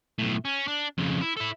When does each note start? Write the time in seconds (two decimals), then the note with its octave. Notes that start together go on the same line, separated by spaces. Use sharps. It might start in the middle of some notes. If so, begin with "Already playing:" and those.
0.19 B1 A2
0.45 C#4
0.68 D4
0.98 F2 C#3
1.22 E4
1.37 E4 A4